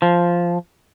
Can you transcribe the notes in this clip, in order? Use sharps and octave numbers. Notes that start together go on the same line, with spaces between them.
F3